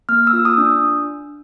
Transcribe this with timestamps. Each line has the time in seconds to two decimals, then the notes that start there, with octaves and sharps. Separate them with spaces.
0.09 A#3 F6
0.27 E6
0.33 F4
0.45 D#6
0.58 D4